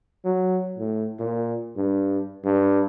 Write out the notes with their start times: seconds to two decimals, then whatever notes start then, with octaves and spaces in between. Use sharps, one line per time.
0.24 F#3
0.78 A2
1.19 A#2
1.76 G2
2.44 G2